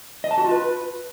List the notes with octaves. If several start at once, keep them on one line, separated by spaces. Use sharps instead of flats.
D#5
A5
F#4
F4
B4